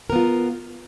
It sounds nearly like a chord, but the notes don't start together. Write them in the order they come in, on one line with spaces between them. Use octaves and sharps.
A#4 B3 F4